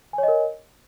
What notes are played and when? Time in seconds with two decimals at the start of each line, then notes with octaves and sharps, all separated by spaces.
0.13 G#5
0.18 C#5
0.23 D#5
0.28 A#4